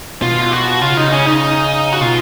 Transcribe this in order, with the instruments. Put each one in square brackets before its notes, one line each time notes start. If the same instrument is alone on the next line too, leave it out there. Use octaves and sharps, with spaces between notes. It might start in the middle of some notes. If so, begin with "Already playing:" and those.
[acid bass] B2 [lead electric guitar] F4
[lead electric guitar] F#4
[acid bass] C#3 [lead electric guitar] F4
[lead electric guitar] D#4
C#4
D#4
F#4
[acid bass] B2 [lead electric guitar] F4